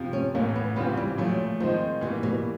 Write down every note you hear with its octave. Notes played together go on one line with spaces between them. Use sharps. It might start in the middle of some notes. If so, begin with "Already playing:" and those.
Already playing: F2 C3 F3
C#4
A2 E3 A3 A#3 C#4
B3
C#3 E3 G3 B3 C4 F4
G3
A#2 F3 F#3 A3
D#3 F3 G#3 C4 D#4
B2 E3 G3 A#3
B2